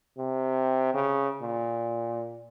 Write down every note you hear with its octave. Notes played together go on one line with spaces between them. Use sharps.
C3
C#3
A#2